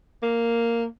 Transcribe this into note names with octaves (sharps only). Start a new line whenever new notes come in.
A#3